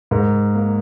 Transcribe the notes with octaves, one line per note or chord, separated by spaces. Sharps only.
G#2 A#4
A#3